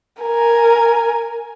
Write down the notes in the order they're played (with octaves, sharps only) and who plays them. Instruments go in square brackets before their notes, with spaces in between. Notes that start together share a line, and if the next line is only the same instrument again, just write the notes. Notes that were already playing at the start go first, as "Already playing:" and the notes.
[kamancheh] A#4 G#5